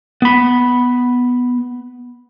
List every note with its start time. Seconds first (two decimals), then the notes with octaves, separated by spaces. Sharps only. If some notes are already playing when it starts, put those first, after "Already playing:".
0.22 B3 B5